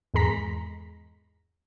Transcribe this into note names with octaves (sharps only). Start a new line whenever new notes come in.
E2 G#2 G#3 A#5 B6